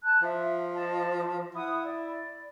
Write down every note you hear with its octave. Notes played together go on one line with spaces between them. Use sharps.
A5 F#6
F3 E5
D#5 A5
E4 F#5 D#6
D5